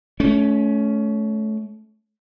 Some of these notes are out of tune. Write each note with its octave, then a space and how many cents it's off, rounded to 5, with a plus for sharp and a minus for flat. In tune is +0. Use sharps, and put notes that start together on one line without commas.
A3 -25 C#4 +15